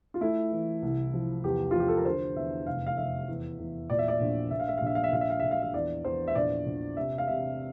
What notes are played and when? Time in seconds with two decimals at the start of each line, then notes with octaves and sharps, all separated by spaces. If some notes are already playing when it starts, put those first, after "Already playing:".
0.14 F4
0.21 A3 E4
0.52 E3
0.82 C2
1.14 F3
1.44 E2 G4
1.71 F4
1.75 F3
1.80 G4
1.88 A4
1.97 A#4
2.05 D3 C5
2.36 E2 E5
2.67 F1 F5
2.87 F5
2.97 F1 E5
3.28 E2
3.59 E2
3.90 A#2 D5
3.99 E5
4.08 D5
4.20 A#1
4.51 A#1 E5
4.60 F5
4.68 E5
4.78 F5
4.82 A#1 E5
4.95 F5
5.04 E5
5.12 A#1 F5
5.21 E5
5.30 F5
5.40 A#1 E5
5.51 F5
5.63 E5
5.74 E2 D5
6.05 E2 C5
6.28 E5
6.35 A#1 D5
6.66 A#1
6.97 C3 E5
7.18 F5
7.27 C3 E5